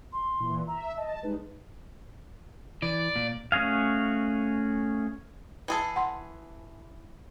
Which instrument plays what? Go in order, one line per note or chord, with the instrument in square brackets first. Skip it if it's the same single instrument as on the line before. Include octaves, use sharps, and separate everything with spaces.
[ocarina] C6
[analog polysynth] A#2 E3
[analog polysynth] E5 [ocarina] A#5
[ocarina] D#5 [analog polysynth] A5
[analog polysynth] G3 G#3 D#4 [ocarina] B4
[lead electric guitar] E3 [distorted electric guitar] D5
[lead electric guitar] A#2
[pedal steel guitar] A3 C#4 F#4 G#4 F5
[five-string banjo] E3 G#4 A4
[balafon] F#5 C6